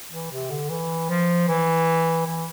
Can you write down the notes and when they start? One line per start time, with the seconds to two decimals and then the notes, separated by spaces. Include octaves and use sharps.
0.11 E3
0.31 C3
0.50 D3
0.70 E3
1.09 F3
1.48 E3
2.26 E3